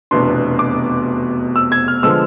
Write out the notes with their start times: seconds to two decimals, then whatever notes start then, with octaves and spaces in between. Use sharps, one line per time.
0.11 F1 E2 B2 B3 D4 C6
0.59 D6
1.56 E6
1.72 G#6
1.88 F6
2.03 D3 F3 G#3 B3 E6